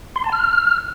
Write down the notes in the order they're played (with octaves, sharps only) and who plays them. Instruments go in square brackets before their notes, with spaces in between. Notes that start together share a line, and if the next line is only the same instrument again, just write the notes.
[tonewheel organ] C6
A5
F6